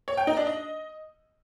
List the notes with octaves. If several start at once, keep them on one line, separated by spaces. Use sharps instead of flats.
C#5
G5
D#4
D4
D#5